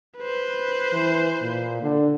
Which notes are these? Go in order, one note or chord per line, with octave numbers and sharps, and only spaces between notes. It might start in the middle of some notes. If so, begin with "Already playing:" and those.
B4 C5
E3
A#2
D3